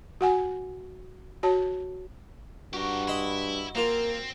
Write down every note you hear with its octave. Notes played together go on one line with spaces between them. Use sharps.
F#4 F#5 G#5
F#4 C#5 A5
G2 F#4 G4 A#4
E4 D#5 B5 C6
A#3 C4 F4 A#4